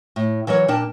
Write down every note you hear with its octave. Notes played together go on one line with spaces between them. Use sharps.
A2
E3 F#3 A#4 C#5
A#2 D4 A#4 G5 A5